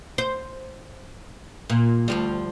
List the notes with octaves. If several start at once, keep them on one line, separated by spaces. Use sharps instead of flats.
C5
A#2
D2 F3 G3